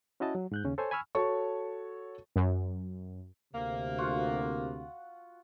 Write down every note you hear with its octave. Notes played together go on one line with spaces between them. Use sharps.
C#4 E4 F#4 D#5 A5
F#3
G#2 F#6 G6
D#2 C#3 C#4
A4 C5 C#5 G#5
G#5 B5 C#6 E6 F6
F#4 A4 C#5 A5 C#6
F#2
D2 C3 A#3
F4 F#4 F#5